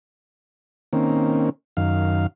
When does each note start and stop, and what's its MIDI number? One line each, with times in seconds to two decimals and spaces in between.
0.93 1.49 51
0.93 1.49 58
0.93 1.49 60
0.93 1.49 61
1.77 2.27 42
1.77 2.27 51
1.77 2.27 77